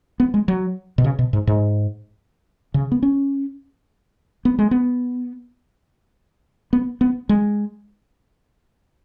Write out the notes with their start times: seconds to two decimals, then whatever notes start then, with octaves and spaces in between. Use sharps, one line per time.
0.20 B3
0.34 G#3
0.48 F#3
0.98 B2
1.04 C#3
1.19 B2
1.33 G#2
1.47 G#2
2.74 C#3
2.92 B3
3.03 C#4
4.45 B3
4.59 G#3
4.71 B3
6.73 B3
7.01 B3
7.29 G#3